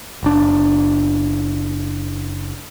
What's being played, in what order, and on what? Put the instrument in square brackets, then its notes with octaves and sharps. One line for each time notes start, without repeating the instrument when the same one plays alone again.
[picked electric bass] F#1 D4